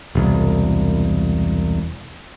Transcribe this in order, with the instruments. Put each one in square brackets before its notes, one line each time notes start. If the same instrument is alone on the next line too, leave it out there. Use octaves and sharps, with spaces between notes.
[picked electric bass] E1 C2